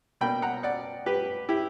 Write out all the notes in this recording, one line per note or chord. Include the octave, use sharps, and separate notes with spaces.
B2 A#3 D4 G5 B5
F#5 A#5
D5 F#5
G4 B4
E4 G4